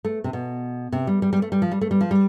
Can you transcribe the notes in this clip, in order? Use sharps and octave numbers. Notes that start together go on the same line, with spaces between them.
A3
C3
B2
C3
G3
G3
G3
A3
G3
F3
G3
A3
G3
F3
G3